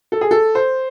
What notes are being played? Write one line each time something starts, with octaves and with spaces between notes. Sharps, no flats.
A4
G#4
A4
C5